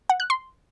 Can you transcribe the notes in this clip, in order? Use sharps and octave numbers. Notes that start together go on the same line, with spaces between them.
F#5
F#6
C6